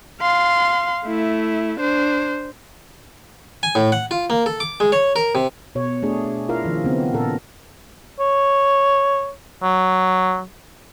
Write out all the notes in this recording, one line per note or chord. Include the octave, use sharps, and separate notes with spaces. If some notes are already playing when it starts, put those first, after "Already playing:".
F5 C6
A3 E4
D4 C5
G#5
A2
F#5
F4
A#3
A4
D6
G#3
C#5
A#4
C3
B2 C#5
A3 D4 G#4
E4 F4 A#4 F5
D#3 F3
C#3 B3 C4
A#2 A4 A#4
C#5
F#3